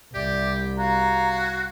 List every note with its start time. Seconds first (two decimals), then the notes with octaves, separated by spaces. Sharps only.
0.14 C2 G4 D5 E5 D6
0.78 F#4 F5 A#5 G#6